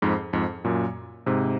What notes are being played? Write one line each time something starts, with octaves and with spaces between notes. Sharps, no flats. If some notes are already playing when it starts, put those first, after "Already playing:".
F2 G#2
F2 G#2
F#2 A#2
G#2 C3